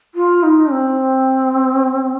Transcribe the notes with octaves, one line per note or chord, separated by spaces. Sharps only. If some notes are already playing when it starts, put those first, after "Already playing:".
F4
D#4
C4